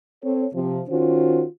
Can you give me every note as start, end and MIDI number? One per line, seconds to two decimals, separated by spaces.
0.23 0.45 60
0.23 0.45 69
0.23 0.45 73
0.53 0.81 48
0.53 0.81 53
0.89 1.43 51
0.89 1.43 61
0.89 1.43 65
0.89 1.43 66
0.89 1.43 72